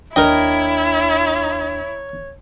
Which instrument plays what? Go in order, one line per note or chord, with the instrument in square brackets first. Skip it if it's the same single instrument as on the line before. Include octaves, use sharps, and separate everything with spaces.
[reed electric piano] D#2 D4 G5 [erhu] E4 [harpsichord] A#4 D#5 [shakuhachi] C#5